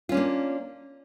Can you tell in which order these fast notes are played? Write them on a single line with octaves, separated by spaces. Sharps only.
F4 C#4 D4 A#3